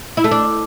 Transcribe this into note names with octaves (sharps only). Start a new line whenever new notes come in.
E4
A3
D4